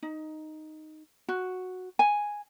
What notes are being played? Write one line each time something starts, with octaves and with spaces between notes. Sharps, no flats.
D#4
F#4
G#5